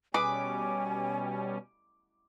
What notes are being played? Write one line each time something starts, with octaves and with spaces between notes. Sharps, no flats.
B2 G3 C#4 G#4 B4 G#5 D6